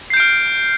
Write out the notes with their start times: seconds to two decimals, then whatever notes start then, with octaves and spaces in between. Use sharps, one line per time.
0.10 C7
0.14 G6
0.17 D7
0.20 F6